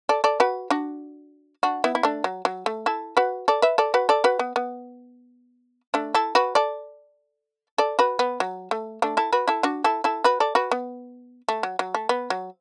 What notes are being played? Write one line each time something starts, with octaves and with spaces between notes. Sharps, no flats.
A4 D5
A4 D5
F#4 B4
D4 F#4
D4 F#4
B3 E4
E4
A3 D4
F#3
F#3
A3
E4 A4
F#4 B4
A4 D5
B4 E5
A4 D5
F#4 B4
A4 D5
F#4 B4
B3
B3
A3 D4
E4 A4
F#4 B4
A4 D5
A4 D5
F#4 B4
B3
F#3
A3
A3 D4
E4 A4
F#4 B4
E4 A4
D4 F#4
E4 A4
E4 A4
F#4 B4
A4 D5
F#4 B4
B3
A3
F#3
F#3
A3
B3
F#3